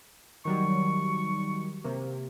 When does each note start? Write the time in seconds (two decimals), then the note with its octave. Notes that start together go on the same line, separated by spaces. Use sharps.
0.45 D#3 F#3 G3 C#6
1.84 C3 A#3